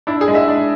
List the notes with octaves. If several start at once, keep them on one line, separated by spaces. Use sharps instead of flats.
D4 E4
G#4
G#3
E5
D4